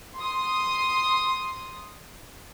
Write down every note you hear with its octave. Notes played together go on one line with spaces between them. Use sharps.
C6 D#6